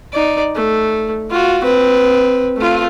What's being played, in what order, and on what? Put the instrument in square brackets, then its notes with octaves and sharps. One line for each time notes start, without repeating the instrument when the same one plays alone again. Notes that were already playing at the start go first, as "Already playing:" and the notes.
[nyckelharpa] D#4 D5
A3
F4 F#4
C4 B4
A3 F4